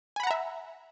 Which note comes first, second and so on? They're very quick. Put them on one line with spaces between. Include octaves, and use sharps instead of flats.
G#5 B5 F#5 A#5 E5